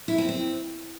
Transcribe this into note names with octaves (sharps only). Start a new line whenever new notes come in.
E4
C4
C4